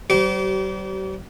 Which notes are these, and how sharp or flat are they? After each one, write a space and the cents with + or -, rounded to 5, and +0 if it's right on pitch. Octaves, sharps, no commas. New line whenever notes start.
G3 -45 G4 -35 C5 -25